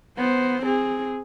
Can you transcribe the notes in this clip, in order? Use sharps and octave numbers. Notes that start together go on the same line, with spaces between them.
B3 C5
C4 G#4